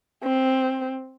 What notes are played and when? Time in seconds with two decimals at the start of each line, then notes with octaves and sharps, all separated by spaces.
0.23 C4